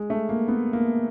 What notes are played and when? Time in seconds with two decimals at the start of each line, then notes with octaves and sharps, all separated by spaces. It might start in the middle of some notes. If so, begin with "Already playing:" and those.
Already playing: G#3
0.10 A3
0.29 A#3
0.48 B3
0.73 A#3